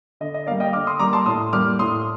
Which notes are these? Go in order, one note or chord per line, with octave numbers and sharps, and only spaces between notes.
D3 D#5
D#5
G3 A#3 D5 F5
D#5 G5
D3 D6 F6
C6 D#6
G3 A#3 A#5 D6
A5 C6
A2 C6 D#6
G3 A#3 D6 F6
A2 C6 D#6